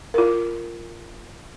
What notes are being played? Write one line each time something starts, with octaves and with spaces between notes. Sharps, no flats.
F4 A#4